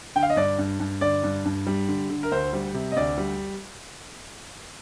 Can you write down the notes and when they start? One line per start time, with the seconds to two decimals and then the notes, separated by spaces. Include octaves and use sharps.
0.16 D3 G5
0.23 F5
0.30 D#5
0.36 G2 D5
0.58 G2
0.80 G2
1.01 D3 D5
1.24 G2
1.45 G2
1.67 G3
1.88 D3
2.10 D3
2.23 A#4
2.32 D2 C5
2.53 G3
2.74 C3
2.92 D#5
2.96 D2 D5
3.18 G3